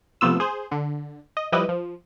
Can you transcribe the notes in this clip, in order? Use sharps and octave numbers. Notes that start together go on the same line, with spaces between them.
C3 F3 A3 B3 F4 E6
G#4 C5
D3
D#5
F3 G3 E4 G4 B4 D#5
F3